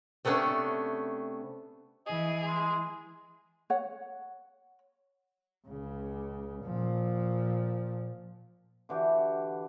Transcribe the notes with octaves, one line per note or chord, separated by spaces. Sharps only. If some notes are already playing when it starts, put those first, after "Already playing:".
C3 A3 B3 C#4 D4
E3 G#4 D#5
G#3
C#5 F#5
C#2 C#3
A#2 F3
D3 E3 F#4 G4